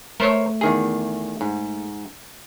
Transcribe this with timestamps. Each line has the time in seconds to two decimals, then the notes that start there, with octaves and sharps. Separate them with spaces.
0.20 A3 A#4 C5 C#5
0.61 E2 D#3 G#4
1.41 G#2